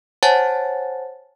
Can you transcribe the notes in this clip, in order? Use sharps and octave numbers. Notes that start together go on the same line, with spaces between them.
C5 C#5 F#5 G#5 A5 A6